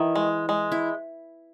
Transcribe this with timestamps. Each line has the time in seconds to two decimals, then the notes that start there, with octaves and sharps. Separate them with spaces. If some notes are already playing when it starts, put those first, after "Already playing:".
Already playing: D#3 E3 E4
0.16 G#3
0.49 G#3
0.72 E4